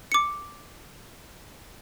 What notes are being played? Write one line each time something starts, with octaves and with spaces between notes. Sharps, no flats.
D6 C#7